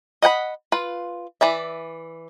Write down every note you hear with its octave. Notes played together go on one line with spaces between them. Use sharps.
D#5 F#5 G5 B5
F4 B4
E3 D5 E5